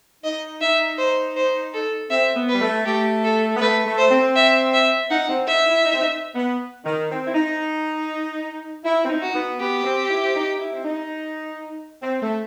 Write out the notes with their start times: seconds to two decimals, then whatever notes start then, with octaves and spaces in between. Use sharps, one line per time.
0.24 D#4 D#5
0.61 D#4 E5
0.99 C5
1.36 C5
1.74 A4
2.10 C4 E5
2.36 B3
2.49 G3 B4
2.61 A3
2.85 A3 G4
3.24 A4
3.56 B3
3.61 A3 B4
3.86 A3
3.98 C5
4.10 C4
4.36 E5
4.74 E5
5.10 D#4 F#5
5.29 C4
5.47 D#4 E5
5.67 E4
5.85 D#4
5.94 C4
6.02 D#4
6.36 B3
6.85 D#3
7.10 C4
7.27 E4
7.35 D#4
8.85 E4 E5
9.05 C4
9.10 D#4
9.22 F#4
9.35 B3
9.60 B3 G4
9.84 C4
10.09 E4
10.24 C4
10.34 D#4
10.59 E4
10.72 C4
10.84 D#4
12.03 C4
12.22 A3